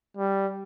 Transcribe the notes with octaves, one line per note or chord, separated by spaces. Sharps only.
G3